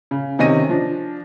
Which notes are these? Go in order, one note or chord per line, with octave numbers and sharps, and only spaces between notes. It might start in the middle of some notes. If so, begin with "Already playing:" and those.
C#3
C3 D#3 C#4 D#5 A#6 D#7
F3 D4